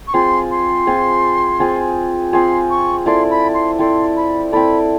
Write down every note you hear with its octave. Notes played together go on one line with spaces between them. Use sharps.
C#6
C4 F4 G#4 C6
C6
C4 F4 G#4
C4 F4 G#4
C4 F4 G#4 C6
C#6
C4 E4 A4 D5 C6
B5
C6
C4 E4 A4 D5 C6
B5
C4 E4 A4 D5 B5